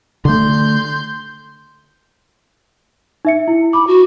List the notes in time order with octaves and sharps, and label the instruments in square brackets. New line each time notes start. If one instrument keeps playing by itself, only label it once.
[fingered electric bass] D3 A3 [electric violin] C6 G6
[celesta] D#4 E5 C#7
E4
[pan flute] B5 [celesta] D6
[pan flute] F#4